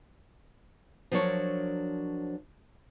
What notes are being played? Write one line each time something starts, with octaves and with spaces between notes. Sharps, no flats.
F3 F#3 D4 A#4 C#5